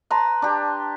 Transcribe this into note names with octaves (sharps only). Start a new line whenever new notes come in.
B4 A5 A#5 C6
D4 G4